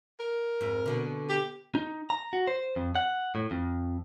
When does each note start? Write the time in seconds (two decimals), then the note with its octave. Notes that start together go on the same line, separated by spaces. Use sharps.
0.20 A#4
0.61 F2 G#2
0.86 B2 D3
1.29 G4
1.75 D#4
2.10 A#5
2.33 F#4
2.47 C5
2.76 F2
2.96 F#5
3.35 A2
3.51 F2